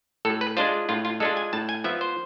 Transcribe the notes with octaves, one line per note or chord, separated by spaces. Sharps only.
A2 A4
B4
G#3 D4 F4 C5
A2 F4
F4
G#3 D4 F4 A4
G#5
A2 A5
G#5
F3 B3 E5
C5